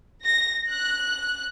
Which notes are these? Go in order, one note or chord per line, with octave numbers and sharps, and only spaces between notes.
A#6
F#6